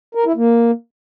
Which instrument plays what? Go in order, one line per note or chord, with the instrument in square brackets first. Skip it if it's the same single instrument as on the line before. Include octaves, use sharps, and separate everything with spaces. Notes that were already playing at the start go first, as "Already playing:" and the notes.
[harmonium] A#4
E4
A#3